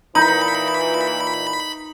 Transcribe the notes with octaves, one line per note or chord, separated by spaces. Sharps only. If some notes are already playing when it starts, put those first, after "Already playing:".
A#2 E3 D#4 A#5 B5 G6